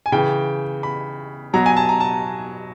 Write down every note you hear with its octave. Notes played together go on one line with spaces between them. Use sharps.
G#5
C#3 E3 G5
B5
B2 F#3 A#5
G#5
A5
A#5
A5